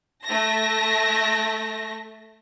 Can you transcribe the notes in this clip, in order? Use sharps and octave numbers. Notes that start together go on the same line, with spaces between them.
A3 E5 A5 A#6